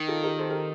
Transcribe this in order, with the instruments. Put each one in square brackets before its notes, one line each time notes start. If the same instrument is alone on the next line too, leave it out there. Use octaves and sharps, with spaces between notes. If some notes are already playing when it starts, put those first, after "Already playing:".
Already playing: [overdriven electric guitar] D#3 [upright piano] D#4
[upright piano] F4 A4
G4 A#4
A4 C5
G4 A#4